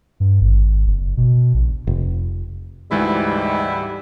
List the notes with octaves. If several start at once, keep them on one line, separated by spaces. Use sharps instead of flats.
G2
G#1
F#1
B2
A#1
F1
D2 G#2 E3 G3 E4